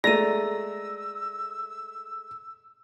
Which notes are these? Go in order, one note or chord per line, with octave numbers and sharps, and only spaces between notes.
G#3 A3 D5 A#5 E6 A#6 D#7